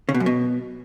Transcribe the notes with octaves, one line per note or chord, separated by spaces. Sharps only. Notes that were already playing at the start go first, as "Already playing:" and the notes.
C#3
B2
F#2
B2